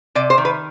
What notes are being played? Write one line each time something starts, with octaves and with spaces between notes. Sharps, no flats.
C3 D5
C5
D#3
B4